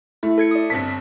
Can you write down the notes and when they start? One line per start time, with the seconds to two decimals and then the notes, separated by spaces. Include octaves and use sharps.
0.23 A3 E4
0.38 A4 G#6 C#7
0.51 D5 D#6
0.70 G1 C4 A5 B6